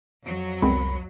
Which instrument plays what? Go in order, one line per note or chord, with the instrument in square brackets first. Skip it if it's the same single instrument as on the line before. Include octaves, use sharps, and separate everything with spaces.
[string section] F2 F#3
[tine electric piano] C2 B5 [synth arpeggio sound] G#3 B3 C4